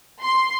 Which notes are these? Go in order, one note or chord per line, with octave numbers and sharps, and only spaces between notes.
C6